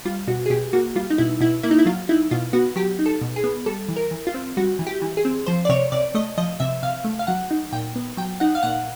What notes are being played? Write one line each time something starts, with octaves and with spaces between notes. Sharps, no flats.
G3 F4
B2 F#4
G#4
B2 G4
A#3 F#4
G3 F4
D#4
B2 E4
B2 E4
A#3 E4
D#4
E4
F#3 F4
D#4 E4
B2 F4
B3 F#4
F#3 G4
D#4
A4
B2
G#4
B3
G3 A4
E3
A#4
E3
F4
C4
G3 F#4
E3
G4
E3
G#4
C4
F3 C5
D5
C3 C#5
C3 D5
A3 D#5
F3 D#5
C3 E5
C3 F5
A3
F5
F#3 F#5
D#4
A#2 G5
B3
F#3 G5
D#4 F#5
F5
A#2 F#5